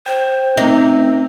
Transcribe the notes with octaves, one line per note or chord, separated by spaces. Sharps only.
C5 G5
A3 C4 C#4 D#4 E5